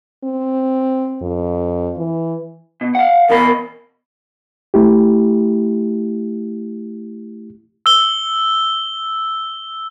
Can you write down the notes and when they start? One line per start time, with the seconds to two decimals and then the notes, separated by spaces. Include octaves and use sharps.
0.24 C4
1.22 F2
1.98 E3
2.81 B2
2.95 F5 F#5
3.30 E2 B2 A#4 B5
4.74 A3 E4 G4
7.86 E6 G7